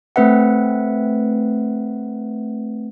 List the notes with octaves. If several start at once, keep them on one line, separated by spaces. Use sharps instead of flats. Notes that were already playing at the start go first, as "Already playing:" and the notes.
A3 C4 B4 E5 F#5